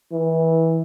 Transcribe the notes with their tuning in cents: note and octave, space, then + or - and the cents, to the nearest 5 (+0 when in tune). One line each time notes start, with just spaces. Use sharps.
E3 -20